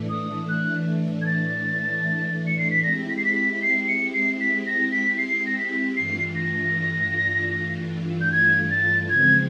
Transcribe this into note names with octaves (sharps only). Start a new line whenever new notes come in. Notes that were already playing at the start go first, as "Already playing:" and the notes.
Already playing: A2 E3 A3 D4
D#6
F#6
G#6
A6
C#7
C7
B6
G#3 C4 E4 G4 A#6
B6
C7
B6
B6
B6
C7
C#7
C7
B6
A#6
B6
C7
A#6
B6
G2 E3 A3 D4 F4 C7
A#6
G6
G#6
A6
C#3 F3 G#3 C4 G#6